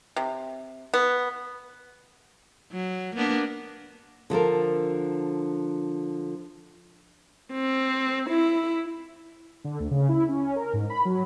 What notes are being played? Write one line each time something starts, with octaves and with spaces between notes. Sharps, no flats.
C3
B3
F#3
A#3 B3 D4
D3 F3 A4 A#4
C4
E4
D3
D2
C#3
E4
C#4
A#4
G#2
B5
F#3